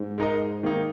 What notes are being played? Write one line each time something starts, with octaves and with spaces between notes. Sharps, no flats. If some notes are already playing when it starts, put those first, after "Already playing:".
Already playing: G#2
G#3 D#4 A#4 D#5
D#3 A#3 D#4